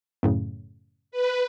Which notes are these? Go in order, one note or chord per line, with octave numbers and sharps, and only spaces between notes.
F#2 A2 C#3
B4